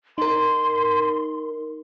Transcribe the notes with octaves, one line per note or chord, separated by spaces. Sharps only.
D#4 A#4 C6